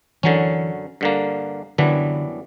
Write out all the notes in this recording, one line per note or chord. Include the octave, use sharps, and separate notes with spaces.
F#2 D3 E3 F#3 C#4
G2 D3 A#3
F#2 D3 E3 G3 B3 D4